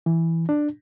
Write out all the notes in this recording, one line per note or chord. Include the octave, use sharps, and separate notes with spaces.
E3
D4